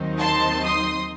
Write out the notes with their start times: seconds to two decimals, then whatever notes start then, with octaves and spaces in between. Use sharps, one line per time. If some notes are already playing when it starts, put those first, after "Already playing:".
Already playing: D#2 D#3 F#3 C4 D#4
0.19 A5 C6
0.64 C6 D#6